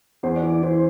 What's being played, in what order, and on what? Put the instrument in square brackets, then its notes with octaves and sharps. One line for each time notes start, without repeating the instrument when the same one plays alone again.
[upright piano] E2 [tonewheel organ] C5
[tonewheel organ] D5
[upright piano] E3
[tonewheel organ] D5
[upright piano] E3 [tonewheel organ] C5